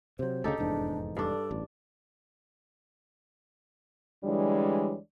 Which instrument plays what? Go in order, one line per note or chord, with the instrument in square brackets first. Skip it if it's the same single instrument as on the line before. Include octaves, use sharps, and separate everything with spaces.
[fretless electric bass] C3 F#3 [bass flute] C5
[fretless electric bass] D2 C#3 [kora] D#4 G4 A4
[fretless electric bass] F1 E2 G#2 [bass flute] D4
[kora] G2 D4 [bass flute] A4
[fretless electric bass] A1
[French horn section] D2 E3 G3 G#3 D4 C#5